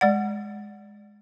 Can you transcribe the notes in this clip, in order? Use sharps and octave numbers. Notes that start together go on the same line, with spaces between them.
G#3 D5 F#5